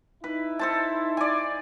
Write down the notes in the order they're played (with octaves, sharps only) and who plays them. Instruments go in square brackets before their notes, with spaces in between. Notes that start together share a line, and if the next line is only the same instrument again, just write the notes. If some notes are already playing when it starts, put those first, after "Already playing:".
[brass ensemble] D#4 E4 [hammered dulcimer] B4
[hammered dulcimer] A4 C5 A5
D5 G#5